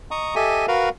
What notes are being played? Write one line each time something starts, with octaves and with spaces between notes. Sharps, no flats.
D#5 A#5 C#6 D#6
G4 A4 D#5 E5 G#5
F#4 A#4 B4 F5